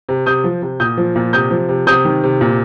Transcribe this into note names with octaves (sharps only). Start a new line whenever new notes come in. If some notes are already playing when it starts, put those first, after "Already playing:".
C3
C3 D#6 G6
F3
C3
A#2 D#6 G6
F3
A#2
C3 D#6 G6
F3
C3
C3 D#6 G6
D#3
C3
A#2